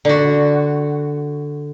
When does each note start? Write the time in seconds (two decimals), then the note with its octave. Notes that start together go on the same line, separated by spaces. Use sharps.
0.05 D3 F#4